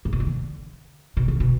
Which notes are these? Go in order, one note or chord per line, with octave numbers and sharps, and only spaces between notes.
G#2
A#2
B2
D3
B2
D3
B2